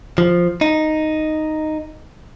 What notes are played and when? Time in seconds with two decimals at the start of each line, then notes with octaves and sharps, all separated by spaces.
0.18 F3
0.61 D#4